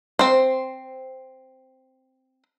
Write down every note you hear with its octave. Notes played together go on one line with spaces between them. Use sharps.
C4 C5